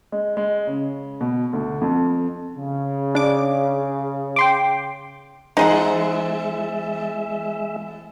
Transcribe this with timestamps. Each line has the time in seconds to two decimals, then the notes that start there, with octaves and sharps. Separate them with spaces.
0.12 G#3
0.37 G#3
0.67 C#3
1.21 B2
1.53 D2
1.81 F2
2.57 C#3
3.15 D4 D6
4.36 G5 C6 D6
5.57 E2 G#3 D#4 G#4 C5 E5 F#5